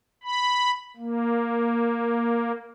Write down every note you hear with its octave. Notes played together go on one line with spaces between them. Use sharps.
B5
A#3